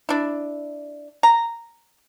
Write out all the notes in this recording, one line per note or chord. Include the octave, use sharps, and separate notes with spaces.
D4 E4
A#5